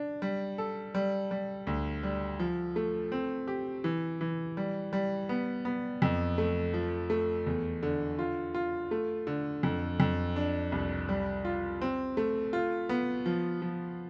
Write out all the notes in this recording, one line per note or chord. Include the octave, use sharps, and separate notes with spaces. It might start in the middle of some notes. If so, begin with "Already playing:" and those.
Already playing: D4
G3
A4
G3
G3
D2
G3
F3
A3
C4
G4
E3
E3
G3
G3
B3
B3
F2
A3
F3
A3
E2
D3
F4
F4
A3
D3
F2
F2
D4
C2
G3
F4
C4
A3
F4
B3
F3
F3